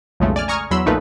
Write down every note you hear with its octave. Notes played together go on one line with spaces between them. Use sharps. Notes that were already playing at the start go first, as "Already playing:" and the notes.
B1 F2 C#3 G#3 A3
D5 G#5 F6
G#5 A#5 C#6 D#6 F6 G#6
E2 F#3 B5 C6 E6
B1 A#2 F3 A3 D#4 B4